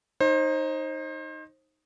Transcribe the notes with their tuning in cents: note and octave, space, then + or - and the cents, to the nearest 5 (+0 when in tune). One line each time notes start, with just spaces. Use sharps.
D#4 +0 C5 +30